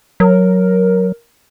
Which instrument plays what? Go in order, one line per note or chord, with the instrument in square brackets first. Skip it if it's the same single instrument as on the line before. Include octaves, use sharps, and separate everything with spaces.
[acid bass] F#3 [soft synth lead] A#4